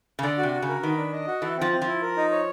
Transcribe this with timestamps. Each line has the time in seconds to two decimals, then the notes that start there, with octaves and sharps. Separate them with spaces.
0.19 C#3
0.23 D3 D5
0.38 F#4
0.43 C3
0.53 F#4
0.62 C#3
0.68 A#4
0.82 D#3 B4
0.97 D4
1.13 D#5
1.27 F#4
1.42 E3 A4
1.57 F3 C4
1.71 C4
1.82 F3
1.87 E4
2.02 A#4
2.17 D#4
2.32 C#5